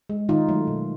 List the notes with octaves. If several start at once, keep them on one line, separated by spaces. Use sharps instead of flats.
G#3
D#3 D#4 F4
F#3 A3
B2